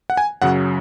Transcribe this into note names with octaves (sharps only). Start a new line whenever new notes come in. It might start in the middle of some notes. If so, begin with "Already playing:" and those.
F#5
G#5
F#2 C#3 F#3 F#5